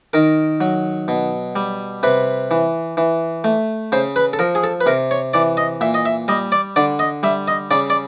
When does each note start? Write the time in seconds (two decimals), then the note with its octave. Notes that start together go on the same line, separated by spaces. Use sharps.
0.13 D#3 A#4
0.61 F#3
1.08 B2
1.56 G3
2.03 C3 B4
2.51 E3
2.97 E3
3.44 A3
3.92 C#3 C5
4.16 B4
4.33 A4
4.39 F3 A#4
4.55 G#4
4.64 A4
4.81 B4
4.86 C3 A#4
5.11 C#5
5.34 E3 D5
5.57 D#5
5.81 A#2 E5
5.94 D#5
6.05 E5
6.28 G3 D#5
6.52 D5
6.76 D3 D5
6.99 D#5
7.23 G3 E5
7.48 D#5
7.71 C#3 D5
7.90 D5